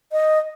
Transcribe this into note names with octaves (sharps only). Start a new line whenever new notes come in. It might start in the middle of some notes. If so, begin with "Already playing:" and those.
D#5